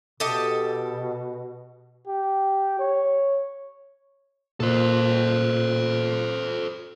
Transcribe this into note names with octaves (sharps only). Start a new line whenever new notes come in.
B2 G4 A4 D#5
G4
C#5
A#2 A4 C5